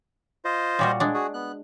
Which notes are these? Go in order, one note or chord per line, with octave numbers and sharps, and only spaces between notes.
F4 C5 D#5
A#2 G3 F#4
G#3 D4
F#4 G#4
B3 F#6